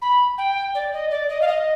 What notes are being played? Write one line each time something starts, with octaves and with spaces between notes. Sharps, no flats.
B5
G5
D5
D#5
D5
D#5
F5
D#5